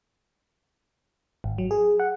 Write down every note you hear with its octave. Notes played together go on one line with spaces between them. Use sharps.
G#1
F#3
G#4
F#5